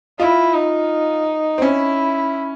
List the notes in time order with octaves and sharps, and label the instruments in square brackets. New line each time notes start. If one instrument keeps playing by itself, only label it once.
[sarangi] E4 [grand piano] F4
[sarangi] D#4
[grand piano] C4
[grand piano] C#4 [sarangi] E4